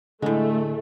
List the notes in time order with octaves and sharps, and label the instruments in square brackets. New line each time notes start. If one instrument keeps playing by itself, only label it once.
[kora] A2 G#3 [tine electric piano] D3 [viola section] A3